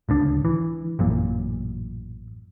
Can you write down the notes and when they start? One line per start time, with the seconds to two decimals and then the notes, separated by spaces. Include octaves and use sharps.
0.09 D1 C#2 D4
0.45 E3
0.99 A1 F#2 A#2